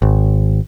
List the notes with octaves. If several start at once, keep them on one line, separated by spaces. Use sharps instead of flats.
G#1